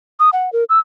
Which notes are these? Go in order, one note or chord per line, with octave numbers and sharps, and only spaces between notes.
D#6
F#5
A#4
E6